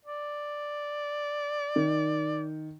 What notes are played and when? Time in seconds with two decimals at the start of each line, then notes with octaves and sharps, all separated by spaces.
0.05 D5
1.76 D#3